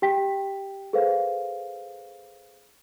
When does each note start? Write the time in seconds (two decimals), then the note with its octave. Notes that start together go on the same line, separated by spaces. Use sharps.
0.02 G4 G5 B6
0.93 G#4 A4 B4 C5 F5